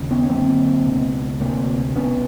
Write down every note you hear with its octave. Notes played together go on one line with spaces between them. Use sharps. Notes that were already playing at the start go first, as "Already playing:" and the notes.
Already playing: D#2 C#3
B3 C#4
C#4
F#2 D3 A#3 C4
C#2 B2
D2 C3 A#3 C4
C2 B2 B3 C#4